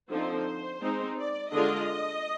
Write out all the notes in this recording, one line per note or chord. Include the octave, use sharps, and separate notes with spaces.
D3 F3 C4 D#4 C5
G#3 C4 D#4
D5
D3 G#3 D4 F4 D#5